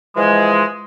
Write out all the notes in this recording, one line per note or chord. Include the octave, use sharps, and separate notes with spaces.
E3 F3 G#3